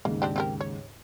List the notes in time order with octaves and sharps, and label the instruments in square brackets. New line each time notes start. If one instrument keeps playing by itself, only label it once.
[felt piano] D#2 G#2 C#3 [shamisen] A#3
[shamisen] C4 D4 G4
C4 G4 A#4
C#5